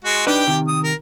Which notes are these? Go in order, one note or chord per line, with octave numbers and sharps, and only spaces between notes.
G#3 F#4
D4 D#4 G4 B4 G5
C3 D#3
D#6
A#4